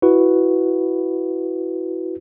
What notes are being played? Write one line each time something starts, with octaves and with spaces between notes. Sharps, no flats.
E4 F#4 B4